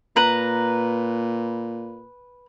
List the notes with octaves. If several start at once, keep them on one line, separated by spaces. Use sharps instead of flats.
A#2 B4 A#5